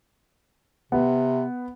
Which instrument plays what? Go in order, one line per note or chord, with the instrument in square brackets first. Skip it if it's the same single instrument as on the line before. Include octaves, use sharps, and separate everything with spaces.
[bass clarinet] C3 [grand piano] B3